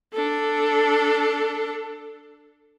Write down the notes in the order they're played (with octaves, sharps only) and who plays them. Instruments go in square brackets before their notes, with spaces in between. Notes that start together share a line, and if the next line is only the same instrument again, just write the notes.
[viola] D4 A4